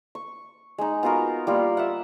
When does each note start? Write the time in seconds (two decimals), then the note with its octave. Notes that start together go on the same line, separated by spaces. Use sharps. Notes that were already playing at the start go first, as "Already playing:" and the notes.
0.15 C#6
0.78 G#3 D#4
1.03 B3 F4 F#4 A#4
1.47 G3 A#3 F4
1.77 E5 F#5